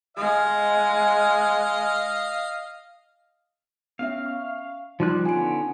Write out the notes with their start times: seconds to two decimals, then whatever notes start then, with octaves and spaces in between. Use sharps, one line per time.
0.17 G#3 D#5 F5
3.99 B3 C#4 E5 F5
4.26 C#6
5.00 F3 G3 D#4 F4 C6 F#6
5.25 D3 B3 C#4 G#5 D7